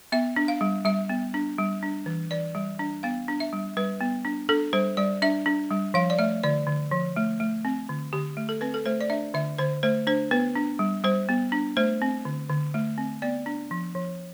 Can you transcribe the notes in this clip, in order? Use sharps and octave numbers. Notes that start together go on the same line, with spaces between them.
B3 E5
D4
F5
G3
G3 E5
B3
D4
G3
D4
E3
E3 D5
G3
D4
B3 F5
D4
E5
G3
G3 B4
B3
D4
D4 A4
G3 C5
G3 D5
D4 E5
D4
G3
F3 F5
D5
A3 E5
D3 D5
D3
F3
A3
A3
C4
D3
D3 G4
A3
A4
C4 B4
A4
A3 C5
D5
D4 E5
D3 E5
D3 C5
A3 C5
D4 C5
B3 B4
D4
G3
G3 C5
B3
D4
A3 C5
C4
D3
D3
A3
C4
B3 D5
D4
F3
F3